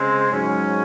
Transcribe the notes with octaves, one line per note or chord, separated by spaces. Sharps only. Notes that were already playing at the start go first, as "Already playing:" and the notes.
Already playing: C#3 G#3 C4
G#2 F#3 C#4